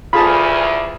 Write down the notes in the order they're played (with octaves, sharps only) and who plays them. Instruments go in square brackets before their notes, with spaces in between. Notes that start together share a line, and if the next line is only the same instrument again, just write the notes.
[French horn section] D2 E3 [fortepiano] F4 G#4 A5 [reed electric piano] B5